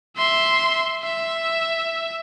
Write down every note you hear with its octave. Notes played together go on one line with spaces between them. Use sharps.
E5 C6
E5